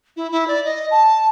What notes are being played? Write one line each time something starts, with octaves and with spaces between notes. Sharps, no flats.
E4
E4
D5
D#5
A5